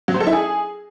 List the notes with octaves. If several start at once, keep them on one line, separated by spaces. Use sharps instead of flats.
F#3
C5
A4
E4
G#4